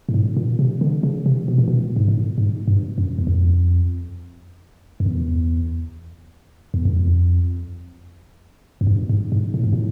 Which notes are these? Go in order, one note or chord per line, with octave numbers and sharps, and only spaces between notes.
A2
G#2
A#2
C3
D3
C#3
C3
B2
A#2
B2
G#2
A2
G#2
G2
F#2
E2
F2
F2
E2
E2
F2
F#2
G2
G#2
G#2
A2
G#2
A2